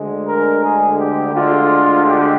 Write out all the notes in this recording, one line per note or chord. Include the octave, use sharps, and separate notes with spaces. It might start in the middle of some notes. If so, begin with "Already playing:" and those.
Already playing: D2 D3 G#3
A#4
G#4
G4
D2 D3 G#3 F4
G4